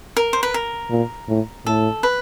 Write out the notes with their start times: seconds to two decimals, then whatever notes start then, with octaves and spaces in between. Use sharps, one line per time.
0.17 A#4
0.33 C5
0.43 B4
0.54 A#4
0.91 A#2
1.28 A2
1.66 A2 A4
2.03 B4